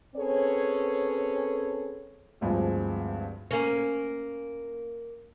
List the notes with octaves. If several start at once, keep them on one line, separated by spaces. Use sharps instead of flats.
C4 C#4 G#4 A4 B4 C#5
D2 G2 F3 G#3 C4
A#3 C#4